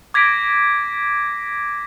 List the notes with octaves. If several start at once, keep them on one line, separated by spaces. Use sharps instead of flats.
D6 G#6 A#6 B6 D7